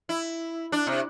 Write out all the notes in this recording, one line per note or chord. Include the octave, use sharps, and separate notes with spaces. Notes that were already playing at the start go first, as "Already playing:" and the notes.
E4
D4
C3